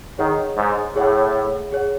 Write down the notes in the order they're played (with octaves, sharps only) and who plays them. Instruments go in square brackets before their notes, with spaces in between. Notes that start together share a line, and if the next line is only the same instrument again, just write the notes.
[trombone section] D#3 [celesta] G#4 C#5 F#5
[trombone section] G#2
[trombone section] A2 [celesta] G#4 C#5 F#5
[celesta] G#4 C#5 F#5